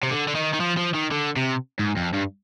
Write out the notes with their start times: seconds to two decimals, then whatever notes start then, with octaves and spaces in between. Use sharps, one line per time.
0.03 C3
0.11 D3
0.28 D3
0.35 D#3
0.53 D#3
0.60 F3
0.77 F3
0.94 D#3
1.12 D3
1.37 C3
1.79 G#2
1.97 F2
2.14 G2